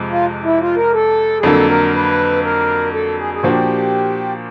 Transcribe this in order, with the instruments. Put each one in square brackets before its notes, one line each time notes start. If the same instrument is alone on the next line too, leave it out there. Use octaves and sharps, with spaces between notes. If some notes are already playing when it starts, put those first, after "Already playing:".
Already playing: [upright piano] F2 C3 F3 G#3
[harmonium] F4
E4
F4
A#4
A4
G#4
[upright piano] F2 D3 F#3 A#3 [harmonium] A4
[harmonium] A#4
B4
A#4
A4
G#4
G#4
[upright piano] A#2 F3 A#3 D4 F#4 [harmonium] G4